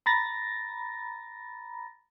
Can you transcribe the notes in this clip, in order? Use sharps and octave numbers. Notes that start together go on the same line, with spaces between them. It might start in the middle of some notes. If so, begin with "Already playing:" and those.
A#5 B5 A6 A#6